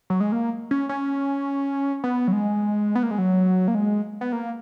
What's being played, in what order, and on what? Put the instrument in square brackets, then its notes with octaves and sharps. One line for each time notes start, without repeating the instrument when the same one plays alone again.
[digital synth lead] F#3
G#3
A#3
C#4
C#4
B3
F#3
G#3
B3
A#3
G#3
F#3
A#3
G#3
B3
A#3